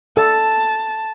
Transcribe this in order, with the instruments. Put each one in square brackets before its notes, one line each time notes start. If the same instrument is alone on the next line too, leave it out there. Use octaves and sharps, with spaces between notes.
[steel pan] A4 [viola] A5